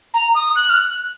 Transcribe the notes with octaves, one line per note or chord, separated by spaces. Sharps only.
A#5
D#6
F#6
F6
F#6